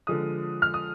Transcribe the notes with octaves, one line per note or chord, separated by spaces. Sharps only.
D3 F3 G#3 D#6
F6
D#6